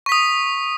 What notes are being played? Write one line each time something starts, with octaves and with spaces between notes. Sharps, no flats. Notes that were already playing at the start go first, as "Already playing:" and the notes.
C#6 D#6 B6